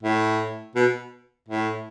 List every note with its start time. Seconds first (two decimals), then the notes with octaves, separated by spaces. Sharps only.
0.03 A2
0.76 B2
1.49 A2